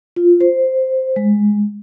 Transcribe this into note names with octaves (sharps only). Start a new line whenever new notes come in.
F4
C5
G#3